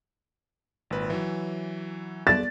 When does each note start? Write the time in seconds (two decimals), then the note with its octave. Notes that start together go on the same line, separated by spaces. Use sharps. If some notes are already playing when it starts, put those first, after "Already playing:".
0.90 G#1 A#2 B4
1.10 E3 F#3
2.27 D5 A6 E7